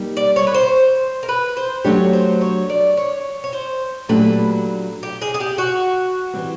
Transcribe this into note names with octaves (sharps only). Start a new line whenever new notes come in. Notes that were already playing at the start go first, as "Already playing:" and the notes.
Already playing: G3 A#3 D#4 G4
D5
C#5
B4
C5
A#4
B4
C5
F#3 A3 D4 G4 C#5
C5
C#5
D5
C#5
C#5
C5
A#2 F#3 A3 D4 G4 B4
G4
G#4
G#4
G4
F#4
E3 G3 C4